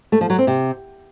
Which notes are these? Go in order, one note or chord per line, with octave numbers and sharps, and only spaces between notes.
A3
F3
F#3
C4
C3